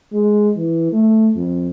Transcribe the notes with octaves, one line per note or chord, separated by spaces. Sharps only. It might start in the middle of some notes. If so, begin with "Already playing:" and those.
G#3
E3
A3
F2